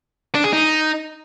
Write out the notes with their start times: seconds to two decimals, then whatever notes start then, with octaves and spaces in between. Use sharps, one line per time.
0.35 D4
0.44 G#4
0.53 D#4